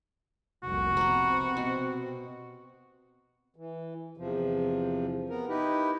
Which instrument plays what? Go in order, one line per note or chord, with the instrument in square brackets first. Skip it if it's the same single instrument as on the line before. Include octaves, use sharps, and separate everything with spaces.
[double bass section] F1 C2 A#2 [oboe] F#4
[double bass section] C3 C4 [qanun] B3 A#4
[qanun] B2
[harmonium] E3
E2 C3 F3
B3 A#4
D#4 E4 G4 B4